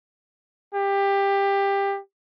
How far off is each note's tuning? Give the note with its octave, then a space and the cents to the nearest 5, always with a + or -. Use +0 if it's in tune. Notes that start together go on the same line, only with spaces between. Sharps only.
G4 +20